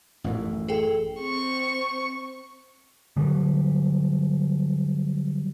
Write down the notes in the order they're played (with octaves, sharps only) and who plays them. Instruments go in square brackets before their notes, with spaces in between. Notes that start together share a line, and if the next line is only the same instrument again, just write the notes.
[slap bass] A1 F#2 A2
[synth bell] G#4 A4 G5
[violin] C4 C#6
[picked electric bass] D3 F#3 G3